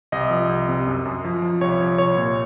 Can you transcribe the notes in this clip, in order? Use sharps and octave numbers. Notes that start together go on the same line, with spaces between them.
C2 D#5
F3
C2
C3
F#2
F#2
F3
F3
C2 C#5
F3
C2 C#5
A#2